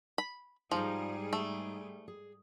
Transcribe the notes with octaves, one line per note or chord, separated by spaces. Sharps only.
B5
G#2 F3 G3 D#4 G#4 A#5
A3
G#4